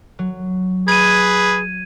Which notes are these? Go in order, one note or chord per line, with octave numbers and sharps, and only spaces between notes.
F#3
G#4 B4 G#6 D#7